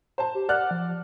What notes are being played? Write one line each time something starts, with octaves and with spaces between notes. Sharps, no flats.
C5 A5
G4
D5 F#5 F6 F#6
F3